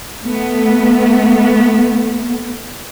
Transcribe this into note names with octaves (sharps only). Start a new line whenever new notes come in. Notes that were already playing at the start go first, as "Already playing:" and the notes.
A3 B3